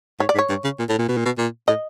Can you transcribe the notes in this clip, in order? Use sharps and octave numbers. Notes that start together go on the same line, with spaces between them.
G#2 C#5
D5
G#2
C#5
G2
C#3
A#2
A2
A#2
B2
A#2
B2
A#2
A2 D#5